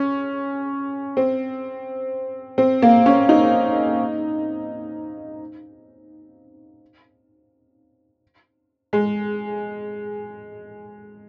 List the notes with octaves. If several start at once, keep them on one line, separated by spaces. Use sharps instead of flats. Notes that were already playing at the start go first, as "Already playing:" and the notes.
Already playing: C#4
C4
C4
A#3
C#4
D#4
G#3